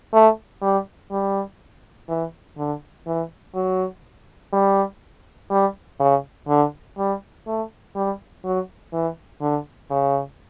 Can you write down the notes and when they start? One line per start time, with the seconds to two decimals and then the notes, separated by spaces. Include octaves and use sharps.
0.13 A3
0.62 G3
1.11 G3
2.09 E3
2.58 D3
3.07 E3
3.55 F#3
4.53 G3
5.51 G3
6.00 C#3
6.48 D3
6.98 G3
7.47 A3
7.96 G3
8.44 F#3
8.93 E3
9.41 D3
9.90 C#3